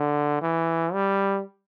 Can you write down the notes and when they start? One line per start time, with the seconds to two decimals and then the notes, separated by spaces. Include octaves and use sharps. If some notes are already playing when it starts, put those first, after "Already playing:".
Already playing: D3
0.41 E3
0.93 G3